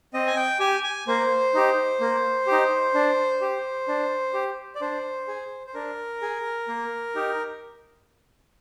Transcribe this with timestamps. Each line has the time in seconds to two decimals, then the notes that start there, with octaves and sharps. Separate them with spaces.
0.14 C4 D#5
0.27 G#5
0.37 G5
0.60 G4 G#5
0.83 G#5
1.07 A#3 C5
1.54 D#4 G4
2.00 A#3
2.47 G4
2.52 D#4
2.94 D4
3.41 G4
3.88 D4
4.34 G4
4.75 D5
4.81 D4 C5
5.28 G#4
5.67 C5
5.74 D4 A#4
6.22 G#4
6.68 A#3
7.15 D#4 G4